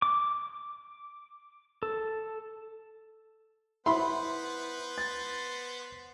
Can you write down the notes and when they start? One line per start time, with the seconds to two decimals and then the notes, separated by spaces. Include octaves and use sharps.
0.02 D6
1.83 A4
3.86 B3 E4 B4 C5 B5 C6
4.98 A6